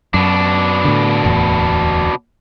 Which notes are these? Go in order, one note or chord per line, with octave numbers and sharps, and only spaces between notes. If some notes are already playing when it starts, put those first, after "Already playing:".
F#2 B2 D4
A2 D3
D1 E2 A2